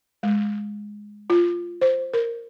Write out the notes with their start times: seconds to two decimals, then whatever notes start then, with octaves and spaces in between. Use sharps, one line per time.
0.23 G#3
1.30 F4
1.81 C5
2.14 A#4